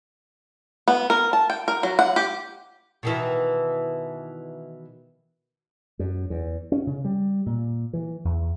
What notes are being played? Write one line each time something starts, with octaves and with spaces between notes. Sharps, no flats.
B3
A#4
A5
G5
A#4
F#3
F#5
G4
B2 D#3 E3
F#2
E2
C#4
C#3
G3
A#2
E3
E2